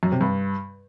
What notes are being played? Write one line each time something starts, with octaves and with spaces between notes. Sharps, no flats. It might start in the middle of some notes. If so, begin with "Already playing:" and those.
F#2
C3
G2